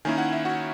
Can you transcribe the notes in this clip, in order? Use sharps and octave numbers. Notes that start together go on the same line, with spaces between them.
D#3 A#3 C#4 E4 G#5
F#5
E5
F#4 F#5